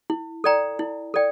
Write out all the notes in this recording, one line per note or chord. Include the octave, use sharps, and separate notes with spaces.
E4
A4 D5 G5 A#5
E4
A4 D5 G5